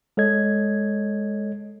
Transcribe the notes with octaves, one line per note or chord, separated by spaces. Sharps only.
G#3 A4 C#5 D#5 G#6